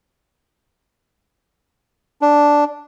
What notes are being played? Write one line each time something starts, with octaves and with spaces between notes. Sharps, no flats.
D4